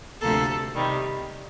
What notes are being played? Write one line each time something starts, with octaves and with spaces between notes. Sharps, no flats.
D2 C3 F3 A#3 A4
C3 D#3 G3